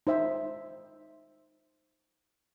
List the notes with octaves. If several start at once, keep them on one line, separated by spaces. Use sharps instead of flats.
D#4 C5 E5 G5